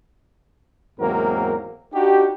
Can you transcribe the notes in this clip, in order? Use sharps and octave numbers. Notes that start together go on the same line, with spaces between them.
E2 G#2 F#3 A#3 C4 A#4
D4 D#4 F#4 G4